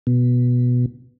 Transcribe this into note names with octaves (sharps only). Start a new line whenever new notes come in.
B2